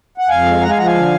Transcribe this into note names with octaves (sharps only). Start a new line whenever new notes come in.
F#5
F2 F5 G#5
G#3
G#3 F#5 A#5
F5 G#5
F3 F#5 A#5
F5 G#5
D3